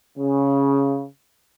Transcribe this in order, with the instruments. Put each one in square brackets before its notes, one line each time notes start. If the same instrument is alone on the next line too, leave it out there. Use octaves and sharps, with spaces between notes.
[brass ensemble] C#3